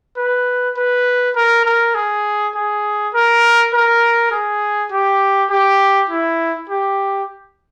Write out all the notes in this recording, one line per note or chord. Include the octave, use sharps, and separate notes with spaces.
B4
B4
A#4
A#4
G#4
G#4
A#4
A#4
G#4
G4
G4
E4
G4